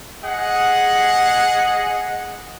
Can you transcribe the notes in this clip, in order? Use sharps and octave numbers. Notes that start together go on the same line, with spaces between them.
G#4 D#5 F#5